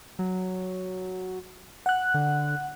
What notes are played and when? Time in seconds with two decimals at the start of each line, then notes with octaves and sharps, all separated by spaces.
0.19 F#3
1.86 F#5 F#6
2.14 D3